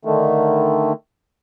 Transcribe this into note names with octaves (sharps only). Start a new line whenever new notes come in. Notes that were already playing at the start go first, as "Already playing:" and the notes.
D3 D#3 A3